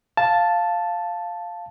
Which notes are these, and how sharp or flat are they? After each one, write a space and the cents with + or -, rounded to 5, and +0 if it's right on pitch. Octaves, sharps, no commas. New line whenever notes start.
F5 +0 A5 +0